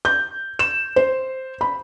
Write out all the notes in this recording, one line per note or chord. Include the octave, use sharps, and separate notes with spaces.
G6
E7
C5
B5